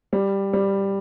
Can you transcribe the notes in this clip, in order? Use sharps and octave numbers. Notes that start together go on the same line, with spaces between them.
G3
G3